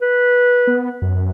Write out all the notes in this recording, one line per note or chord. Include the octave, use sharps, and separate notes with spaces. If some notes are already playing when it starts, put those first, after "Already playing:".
B4
B3
F#2